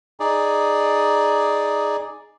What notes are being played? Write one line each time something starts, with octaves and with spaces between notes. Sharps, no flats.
D#4 G#4 D5